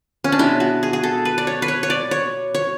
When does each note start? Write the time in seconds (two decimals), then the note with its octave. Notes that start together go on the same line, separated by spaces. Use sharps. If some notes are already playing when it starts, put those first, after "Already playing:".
0.24 C#4
0.32 D4
0.39 B2 G#3 B3 E4
0.60 F#4
0.83 G#4
0.93 G#4
1.03 A4
1.25 B4
1.38 D5
1.47 C#5
1.62 B4
1.68 C#5
1.83 C#5
1.90 D5
2.11 C#5
2.55 C#5